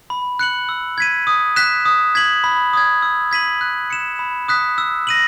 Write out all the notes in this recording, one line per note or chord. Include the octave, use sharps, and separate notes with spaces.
B5
F#6 C#7 F#7
E6
G#6 B6 D#7
D#6
F#6 B6 E7
D#6
G#6 B6 F#7
B5
D#6 G#6
E6
G#6 B6 D#7 F#7
F#6
C#7 E7
B5
D#6 F#6 B6
E6
A#6 D#7 F#7